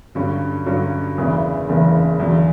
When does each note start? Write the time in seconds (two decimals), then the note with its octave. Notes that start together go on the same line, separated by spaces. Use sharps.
0.15 G2 D3 F#3 C#4
0.66 G2 D3 F#3 C#4
1.18 F#1 E2 C#3 E3
1.68 F#1 E2 C#3 E3
2.19 E2 D3 F#3